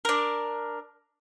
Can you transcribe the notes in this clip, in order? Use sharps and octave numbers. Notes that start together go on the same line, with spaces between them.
D4 A#4